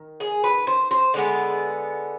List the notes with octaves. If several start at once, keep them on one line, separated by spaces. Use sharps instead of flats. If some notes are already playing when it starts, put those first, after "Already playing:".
Already playing: D#3
G#4
B4
C5
C5
D3 G#3 B3 D5